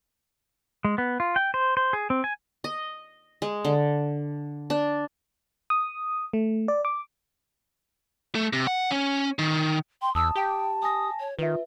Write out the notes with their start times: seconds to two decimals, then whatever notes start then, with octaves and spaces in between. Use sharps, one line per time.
0.85 G#3
0.98 B3
1.20 F4
1.36 G5
1.54 C5
1.77 C5
1.93 G#4
2.10 C4
2.24 G#5
2.64 D#5
3.42 G#3
3.65 D3
4.70 D4
5.70 D#6
6.33 A3
6.68 D5
6.85 D6
8.35 A3
8.53 C3
8.67 F#5
8.91 C#4
9.39 D#3
10.02 G5 C6
10.15 E2 A5 D#6 E6
10.36 G4 G5
10.83 G#5 D#6 A#6
11.20 C#5
11.39 D#3 F4 B4 E5